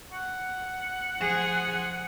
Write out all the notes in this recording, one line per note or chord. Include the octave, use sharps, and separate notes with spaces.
F#5
F3 G#4